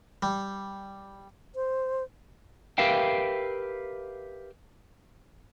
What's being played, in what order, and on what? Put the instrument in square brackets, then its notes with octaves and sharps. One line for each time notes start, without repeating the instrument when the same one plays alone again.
[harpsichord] G3
[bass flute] C5
[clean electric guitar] G4 A#4 B4 E5 F5 G5